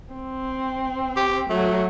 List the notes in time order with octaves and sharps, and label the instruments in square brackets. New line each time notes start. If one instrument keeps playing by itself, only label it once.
[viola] C4
[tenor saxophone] G4
[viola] F#3 [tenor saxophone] A3